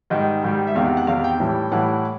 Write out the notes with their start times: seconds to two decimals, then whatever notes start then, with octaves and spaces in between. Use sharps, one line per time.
0.10 G#2 D#3 G3 D#5
0.43 G#2 D#3 G3
0.67 E5
0.75 E2 C3 D#3 F5
0.86 F#5
0.97 F#5
1.07 E2 C3 D#3 F5
1.24 G5
1.40 A2 E3 G3
1.72 A2 E3 G3 F#5